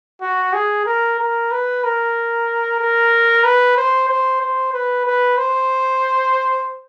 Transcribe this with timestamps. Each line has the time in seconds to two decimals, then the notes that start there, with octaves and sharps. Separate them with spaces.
0.21 F#4
0.53 G#4
0.86 A#4
1.19 A#4
1.51 B4
1.84 A#4
2.80 A#4
3.44 B4
3.77 C5
4.09 C5
4.42 C5
4.73 B4
5.06 B4
5.38 C5